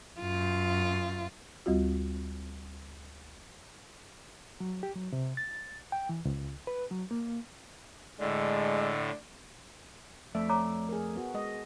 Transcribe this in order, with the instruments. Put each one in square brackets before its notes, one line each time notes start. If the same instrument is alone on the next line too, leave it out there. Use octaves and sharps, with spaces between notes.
[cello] F#2 F4
[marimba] D2 G3 C4 F4 F#4
[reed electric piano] F#3
G4
F#3
C3
A6
G5
E3
C#2
B4
F#3
A#3
[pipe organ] A2 D3 [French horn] G#3 [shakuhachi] D5
[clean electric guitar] F2 A3 D5 [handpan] E5
[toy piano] C#5 A#5 D6
[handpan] G#4 A#4
B3 F#4
G#3 D#5